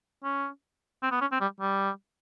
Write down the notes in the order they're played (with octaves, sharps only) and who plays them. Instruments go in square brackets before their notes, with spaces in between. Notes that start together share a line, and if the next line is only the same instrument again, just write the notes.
[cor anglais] C#4
C4
B3
C#4
C4
G3
G3